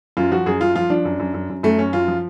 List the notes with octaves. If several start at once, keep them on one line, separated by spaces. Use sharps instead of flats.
F#2 F4
F3 F#4
F#2 G#4
F#2 F4
F3 F4
F3 D4
F#2
F#2
F#2
F#2
F#2 A3
F#2 C#4
F#2 F4
F3